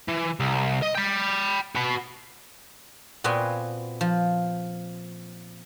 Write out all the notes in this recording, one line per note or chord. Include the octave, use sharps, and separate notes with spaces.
E3
C2
D#5
G5 B5
F#4 B4
A#2 B3 C4 F#4 G5 G#5
F3